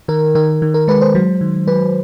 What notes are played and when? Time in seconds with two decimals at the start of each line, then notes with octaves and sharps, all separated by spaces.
0.08 D#3 A#4
0.35 D#3 A#4
0.62 D#3
0.74 A#4
0.88 G#3 B4
1.01 C5
1.15 F#3
1.41 D#3
1.67 F#3 B4